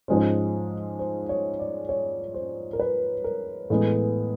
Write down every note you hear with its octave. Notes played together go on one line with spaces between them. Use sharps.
G#2 F3 G#3 C#4 C5
C5
C#5
D5
C#5
C5
A#4
B4
A#4
A2 E3 G#3 B3